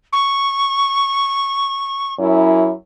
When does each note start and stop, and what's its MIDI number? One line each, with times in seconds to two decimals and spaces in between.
0.13 2.14 85
2.19 2.72 42
2.19 2.72 64
2.19 2.72 73